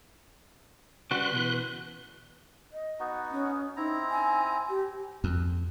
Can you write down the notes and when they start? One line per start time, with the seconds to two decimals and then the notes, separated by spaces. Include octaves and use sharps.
1.11 C#3 G3 F#4 B4 C6 F#6
1.33 B2 E3
2.72 D#5
3.00 B3 D#4 F#4
3.31 C#4
3.77 C4 D#4 E4 A#5
4.10 G#5
4.69 G4
5.24 F2